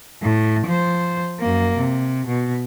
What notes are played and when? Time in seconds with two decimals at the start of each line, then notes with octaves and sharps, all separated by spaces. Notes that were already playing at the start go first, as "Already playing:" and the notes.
0.22 A2
0.66 F3 C5
1.40 F#2 A#3
1.77 C3
2.27 B2